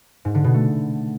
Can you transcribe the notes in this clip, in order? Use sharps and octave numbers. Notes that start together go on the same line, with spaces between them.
G#2
D3
B2
A3